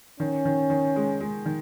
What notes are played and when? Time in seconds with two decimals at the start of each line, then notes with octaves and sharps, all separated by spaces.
0.20 D#3 C#4
0.45 D#3
0.70 D#3
0.96 G#3
1.20 G#3
1.46 D#3